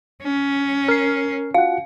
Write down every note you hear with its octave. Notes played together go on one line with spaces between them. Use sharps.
C#4
A#4 F6 C7
F4 F#4 F5 F#5